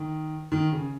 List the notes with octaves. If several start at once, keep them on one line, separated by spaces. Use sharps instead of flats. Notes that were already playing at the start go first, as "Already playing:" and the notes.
Already playing: D#3
D#3
C#3